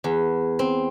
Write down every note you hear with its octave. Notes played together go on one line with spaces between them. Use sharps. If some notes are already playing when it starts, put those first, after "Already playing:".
E2
C4